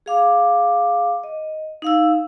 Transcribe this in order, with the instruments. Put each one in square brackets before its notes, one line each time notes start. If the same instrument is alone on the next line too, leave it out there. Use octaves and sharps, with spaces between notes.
[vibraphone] G#4 F5 D6
D#5
D#4 F5 E6